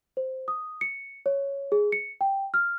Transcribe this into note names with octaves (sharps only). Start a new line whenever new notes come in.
C5
D#6
C#7
C#5
G#4
C#7
G5
F6